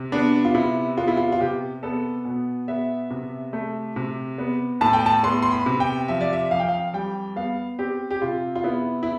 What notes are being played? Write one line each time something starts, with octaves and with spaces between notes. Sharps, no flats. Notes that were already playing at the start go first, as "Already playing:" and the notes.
Already playing: C3
B3 D4
F4
C3 E4
B3 F4
E4
F4
F4
C3 G4
B3 A4
B2
B3 E5
C3
A3
C3
B3
A2 A5
G5
A5
B3 C6
C6
B5
C3
G5
F3 E5
D5
E5
F2 F5
G5
F5
G3 G5
B3 F5
C4 G4
G4
C3 F4
F4
B3 E4
E4